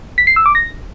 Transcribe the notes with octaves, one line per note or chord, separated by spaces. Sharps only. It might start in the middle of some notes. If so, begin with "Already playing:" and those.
B6
C7
E6
D6
A#6